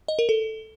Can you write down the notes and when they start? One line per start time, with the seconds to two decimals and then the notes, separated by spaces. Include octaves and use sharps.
0.08 D#5
0.19 A#4
0.29 A4